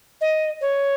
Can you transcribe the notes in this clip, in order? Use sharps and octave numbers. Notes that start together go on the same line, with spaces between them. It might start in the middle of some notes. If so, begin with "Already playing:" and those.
D#5
C#5